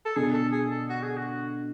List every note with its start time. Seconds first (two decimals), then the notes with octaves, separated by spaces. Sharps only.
0.06 A4
0.16 B2 D3 G#4
0.34 A4
0.52 G#4
0.71 A4
0.90 F#4
1.03 G#4
1.17 F#4